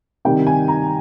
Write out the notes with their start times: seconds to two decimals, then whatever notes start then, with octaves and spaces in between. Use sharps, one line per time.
0.25 C3 D#3 G3 G5
0.47 G#5
0.68 A#5